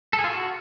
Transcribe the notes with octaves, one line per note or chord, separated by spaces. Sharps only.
A4
G#4
F4
F#4